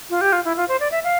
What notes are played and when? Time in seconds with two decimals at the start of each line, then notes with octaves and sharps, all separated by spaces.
0.10 F4
0.21 G4
0.33 F4
0.45 E4
0.57 F4
0.68 C5
0.80 D5
0.91 E5
1.04 F5